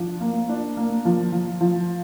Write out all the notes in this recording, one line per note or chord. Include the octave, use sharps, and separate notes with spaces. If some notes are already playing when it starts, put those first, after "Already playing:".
Already playing: F3 D4
A#3
D4
A#3
F3
F3
F3